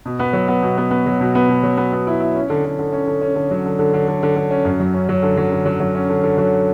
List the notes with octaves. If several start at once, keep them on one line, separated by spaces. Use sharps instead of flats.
B2
B3
F#3
B3
B2
B3
B3
F#3
B2
B3
B2
F#3
B3
B3
E4
E4
C#4
D3
D3
D3
C#4
D3
C#4
D3
F#3
D3
D3
D3
D3
D3
D3
C#4
F#2
F#3
C#4
F#3
D3
F#3
D3
F#3
F#3
C#4
D3
D3
F#3